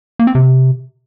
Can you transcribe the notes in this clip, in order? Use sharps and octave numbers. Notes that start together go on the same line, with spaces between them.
A#3
C4
C3